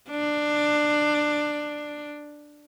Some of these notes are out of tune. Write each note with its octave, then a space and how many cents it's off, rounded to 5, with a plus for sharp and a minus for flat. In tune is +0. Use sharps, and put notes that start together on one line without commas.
D4 +15